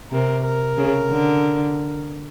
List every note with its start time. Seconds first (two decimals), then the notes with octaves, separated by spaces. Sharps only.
0.11 C3 A#4
0.45 A#4
0.77 C#3
1.10 D3